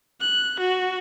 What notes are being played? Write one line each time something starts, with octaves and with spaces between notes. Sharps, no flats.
F#6
F#4